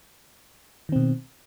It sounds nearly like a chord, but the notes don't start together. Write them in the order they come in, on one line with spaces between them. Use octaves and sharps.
D#3 C4 B2